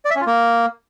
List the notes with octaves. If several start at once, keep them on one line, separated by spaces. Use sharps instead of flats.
D5
E5
C#4
F4
A#3